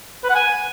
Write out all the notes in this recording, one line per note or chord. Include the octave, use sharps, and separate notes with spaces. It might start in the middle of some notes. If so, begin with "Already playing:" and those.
B4
F#5
G#5